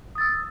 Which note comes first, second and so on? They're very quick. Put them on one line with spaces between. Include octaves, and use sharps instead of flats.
D#6 A6 E6